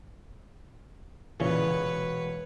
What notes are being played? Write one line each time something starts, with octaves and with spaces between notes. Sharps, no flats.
E1 A#2 C#3 E3 B4 C#5